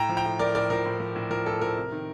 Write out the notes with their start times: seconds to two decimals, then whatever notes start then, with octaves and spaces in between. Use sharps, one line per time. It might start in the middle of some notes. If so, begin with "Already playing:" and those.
Already playing: A2 G5 A#5
0.09 F3
0.17 G5 A#5
0.25 A2
0.39 F3 A#4 D5
0.55 A2 A#4 D5
0.70 F3 A#4
0.85 A2
1.00 F3
1.15 A2
1.30 F3 A#4
1.46 A2 A4
1.61 F3 A#4
1.76 C3
1.92 D#3